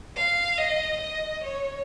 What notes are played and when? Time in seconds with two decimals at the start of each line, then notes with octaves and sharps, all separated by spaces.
0.17 F5
0.58 D#5
1.01 D#5
1.43 C#5